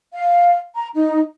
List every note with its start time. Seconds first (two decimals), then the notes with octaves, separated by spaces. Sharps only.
0.13 F5
0.76 A#5
0.93 D#4